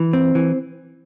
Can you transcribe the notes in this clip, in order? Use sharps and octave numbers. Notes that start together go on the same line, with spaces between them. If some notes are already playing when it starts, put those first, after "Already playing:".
Already playing: E3
C4
E3